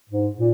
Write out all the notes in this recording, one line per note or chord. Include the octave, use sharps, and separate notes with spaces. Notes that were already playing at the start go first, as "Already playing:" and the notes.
G#2
A#2